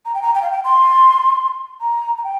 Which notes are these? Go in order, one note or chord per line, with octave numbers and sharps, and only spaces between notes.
A#5
G5
A#5
G5
F5
G5
C6
A#5
A#5
G5